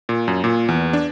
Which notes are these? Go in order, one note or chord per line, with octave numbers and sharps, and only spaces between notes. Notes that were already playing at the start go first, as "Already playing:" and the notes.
A#2
F#2
A#2
E2
D4